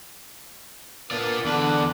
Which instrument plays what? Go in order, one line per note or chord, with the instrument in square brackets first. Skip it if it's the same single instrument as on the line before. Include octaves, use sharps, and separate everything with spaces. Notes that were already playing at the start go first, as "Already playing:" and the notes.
[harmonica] A#3 B3 D4 [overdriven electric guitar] F4 D5
[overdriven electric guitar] E2 B4 [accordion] D3 D4 [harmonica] D6